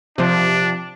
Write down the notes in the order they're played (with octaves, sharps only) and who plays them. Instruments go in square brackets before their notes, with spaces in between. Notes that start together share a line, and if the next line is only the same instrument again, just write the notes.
[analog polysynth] C3 F3 [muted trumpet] D4